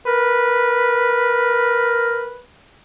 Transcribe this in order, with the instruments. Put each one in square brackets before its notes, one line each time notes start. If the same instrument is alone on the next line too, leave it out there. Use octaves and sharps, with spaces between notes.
[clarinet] A#4 [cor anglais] B4